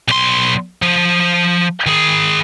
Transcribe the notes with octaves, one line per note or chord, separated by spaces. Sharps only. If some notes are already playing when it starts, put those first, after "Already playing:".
B1 C6
F3
D#3 G#4